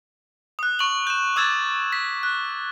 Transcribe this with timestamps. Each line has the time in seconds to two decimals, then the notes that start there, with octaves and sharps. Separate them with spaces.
0.59 D#6 F#6
0.79 C#6 F#7
1.07 G6 E7
1.36 D6 E6 G#6 A6 E7
1.93 B6
2.23 F#6